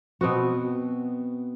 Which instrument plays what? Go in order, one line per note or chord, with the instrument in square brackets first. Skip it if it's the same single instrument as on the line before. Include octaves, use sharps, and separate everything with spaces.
[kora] B2 B3 C4 F#4